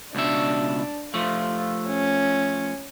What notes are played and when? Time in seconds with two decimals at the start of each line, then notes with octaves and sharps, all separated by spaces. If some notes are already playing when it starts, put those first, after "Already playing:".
0.15 C#2 B2 D4 E5
1.14 F3 A3 F4
1.89 C#4